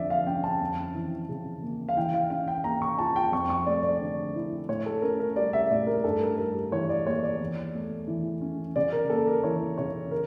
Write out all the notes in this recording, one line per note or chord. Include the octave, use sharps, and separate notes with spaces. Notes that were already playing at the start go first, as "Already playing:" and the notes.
Already playing: F2 D3 F3 D5 E5
F5
C#4 G5
A5
F2
E3
C#3
A#3
F5
E3 G5
F5
C#4 F5
G5
A#3 A#5
C#6
F4 A5
G5
F2 C#6
C#6
A3 D5
D5
D3
E4
A2 C#5
A4
C#4 A#4
A#4
G3 D5
E5
A2 D5
A#4
G2 A4
A#4
G3 A#4
E3 C#5
D5
A#3 C#5
D5
E2
A3
E3
C#4
C#3 D5
A#4
A#3 A4
A#4
E3 C#5
C#3 C#5
A#4